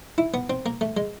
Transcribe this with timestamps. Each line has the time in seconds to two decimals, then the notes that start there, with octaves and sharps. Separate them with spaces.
0.18 E4
0.34 B3
0.50 C4
0.66 A#3
0.81 A3
0.97 G#3